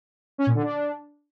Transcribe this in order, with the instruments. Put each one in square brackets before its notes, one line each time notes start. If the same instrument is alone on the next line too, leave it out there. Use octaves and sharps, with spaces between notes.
[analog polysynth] C#4
A#2
D3
D4